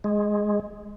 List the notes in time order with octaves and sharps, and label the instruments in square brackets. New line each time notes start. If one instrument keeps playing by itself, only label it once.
[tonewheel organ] G#3